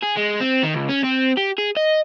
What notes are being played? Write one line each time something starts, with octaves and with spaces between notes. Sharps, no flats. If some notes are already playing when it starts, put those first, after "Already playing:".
G#4
G#3
C4
D#3
C#2
C#4
C4
G4
G#4
D#5